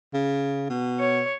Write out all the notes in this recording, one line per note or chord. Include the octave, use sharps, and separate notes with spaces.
C#3
B2
C#5